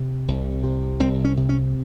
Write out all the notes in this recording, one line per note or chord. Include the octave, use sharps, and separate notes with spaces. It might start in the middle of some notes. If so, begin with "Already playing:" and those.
Already playing: C3
C2
C3
C2 C4
C#4
C3
C#4